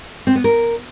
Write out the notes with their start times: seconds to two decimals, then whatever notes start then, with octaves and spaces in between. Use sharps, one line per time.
0.27 C4
0.36 B3
0.44 A#4